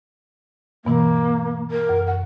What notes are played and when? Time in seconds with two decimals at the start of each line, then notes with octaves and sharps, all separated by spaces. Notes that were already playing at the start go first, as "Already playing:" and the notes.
0.85 G2 B2 E3 A#3
1.71 A#4
1.89 F#2
2.07 F#5